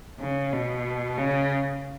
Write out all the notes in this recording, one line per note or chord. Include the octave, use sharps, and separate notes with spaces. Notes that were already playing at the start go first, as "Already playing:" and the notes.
C#3
B2
C#3